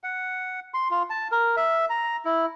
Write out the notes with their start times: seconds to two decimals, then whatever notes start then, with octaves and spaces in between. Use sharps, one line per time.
0.04 F#5
0.74 C6
0.91 F4
1.10 A5
1.31 A#4
1.57 E5
1.90 A#5
2.25 E4